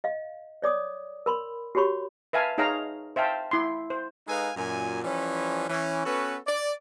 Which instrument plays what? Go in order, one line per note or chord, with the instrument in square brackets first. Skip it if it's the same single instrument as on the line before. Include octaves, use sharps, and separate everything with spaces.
[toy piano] D#5 F5
C#5 D5 D6 D#6
A#4 B5 C6
F#4 G4 C#5 B5 C#6
[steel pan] B4 E5 F5 G#5 A5
D#4 G#4 C#5 F5 A#5
C5 E5 F5 G5 A5
E4 C6
C5
[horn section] G#3 D#4 A4 B4 F5 G#5
F#2 A#2 G#5
E3 F3 G3 C#4
E3 C#4
B3 C#4 F#4 A4 B4
D5